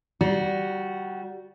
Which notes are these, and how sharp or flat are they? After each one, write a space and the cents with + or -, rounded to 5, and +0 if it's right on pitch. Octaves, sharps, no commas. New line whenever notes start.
G3 -15 F#4 +0 A#5 +35